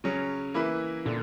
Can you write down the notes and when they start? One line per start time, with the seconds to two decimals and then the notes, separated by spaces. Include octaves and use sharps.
0.04 C#3 F#3 C#4
0.54 E3 A#3 E4 B4
1.05 A#2 D3